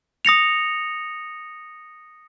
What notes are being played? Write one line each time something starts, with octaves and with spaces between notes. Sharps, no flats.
D#6 A#6 C#7 F7